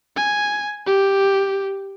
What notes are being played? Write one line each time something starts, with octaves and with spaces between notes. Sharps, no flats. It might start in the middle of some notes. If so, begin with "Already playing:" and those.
G#5
G4